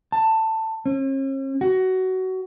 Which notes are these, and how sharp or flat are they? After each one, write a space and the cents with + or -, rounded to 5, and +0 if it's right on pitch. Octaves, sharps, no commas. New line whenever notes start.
A5 +15
C#4 -45
F#4 +20